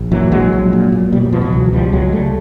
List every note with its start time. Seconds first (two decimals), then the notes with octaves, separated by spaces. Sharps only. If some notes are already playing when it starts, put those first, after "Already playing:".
Already playing: A#1
0.12 A#2 E3 F#3
0.32 A#1 F#3 G#3
0.53 A#1
0.73 A#2
0.92 A#2
1.13 B2 G3
1.22 F#3
1.33 B2 F3
1.41 E3 F#3
1.53 C#2
1.66 F#3
1.73 C#2 F3 G3
1.92 C#2 F#3 G#3
2.12 C#2 G3 A3